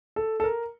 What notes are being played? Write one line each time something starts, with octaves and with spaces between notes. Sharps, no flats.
A4
A4
A#4